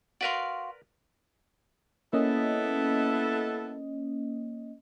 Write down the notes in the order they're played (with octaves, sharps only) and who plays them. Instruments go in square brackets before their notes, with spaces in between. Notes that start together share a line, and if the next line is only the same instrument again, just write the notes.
[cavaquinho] F#4 F5 C6 [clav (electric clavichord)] A#4 B4 D5
[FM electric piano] A#3 C#4 D#5 [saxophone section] B3 E4 A4